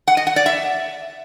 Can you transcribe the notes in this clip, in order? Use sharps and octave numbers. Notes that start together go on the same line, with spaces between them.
F#5
D#5
F#5
D5
E5